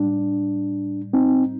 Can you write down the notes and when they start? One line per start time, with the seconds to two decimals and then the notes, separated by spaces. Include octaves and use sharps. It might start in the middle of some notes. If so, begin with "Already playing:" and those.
Already playing: A2 G3 D4
1.13 C4 D#4